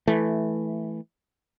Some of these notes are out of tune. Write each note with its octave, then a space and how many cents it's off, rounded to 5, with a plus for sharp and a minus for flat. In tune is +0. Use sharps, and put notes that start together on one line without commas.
E3 +0 A3 -10